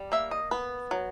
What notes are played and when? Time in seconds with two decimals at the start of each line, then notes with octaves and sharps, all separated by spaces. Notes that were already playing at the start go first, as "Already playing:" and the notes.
Already playing: G3
0.12 A#3 E5
0.31 D#5
0.51 B3 B4
0.91 F#3